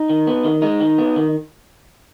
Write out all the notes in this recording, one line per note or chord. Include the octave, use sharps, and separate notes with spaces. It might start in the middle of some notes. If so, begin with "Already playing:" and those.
Already playing: D#4
D#3
B3
D#3
G#3 D#4
D#3
B3
D#3